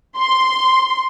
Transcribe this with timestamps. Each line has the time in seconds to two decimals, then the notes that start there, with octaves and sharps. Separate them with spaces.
0.19 C6